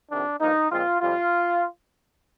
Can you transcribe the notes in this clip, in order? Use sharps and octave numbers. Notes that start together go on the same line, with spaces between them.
F2 C3 D#3 D4
G2 F3 A#3 D#4
A#2 F3 G#3 C4 F4
F2 C3 G3 F4